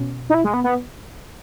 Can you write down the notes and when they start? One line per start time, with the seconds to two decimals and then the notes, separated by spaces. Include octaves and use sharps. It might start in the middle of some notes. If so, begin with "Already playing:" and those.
Already playing: B2 C#4
0.30 D#4
0.34 E4
0.44 G#3
0.54 B3
0.64 B3